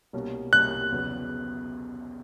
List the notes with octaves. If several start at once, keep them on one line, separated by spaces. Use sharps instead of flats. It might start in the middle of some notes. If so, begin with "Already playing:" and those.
C2 B2 G3 A#3 C#4
C2 B2 G3 A#3 C#4 F#6
E2 C#3 F#3 B3